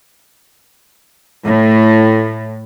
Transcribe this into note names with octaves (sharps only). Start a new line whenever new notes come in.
A2